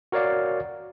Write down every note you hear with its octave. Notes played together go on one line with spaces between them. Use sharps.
F#4 A#4 C#5 D5 F5